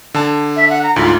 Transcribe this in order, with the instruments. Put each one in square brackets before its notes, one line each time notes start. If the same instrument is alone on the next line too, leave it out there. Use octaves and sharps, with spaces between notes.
[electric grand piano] D3 A5
[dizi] E5
F#5
A#5
[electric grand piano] D2 G#2 [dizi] F4